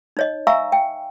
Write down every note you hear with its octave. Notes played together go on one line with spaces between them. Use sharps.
D#4 C#5 D#5
E5 F5 G#5 A#5 C#6 E6
G5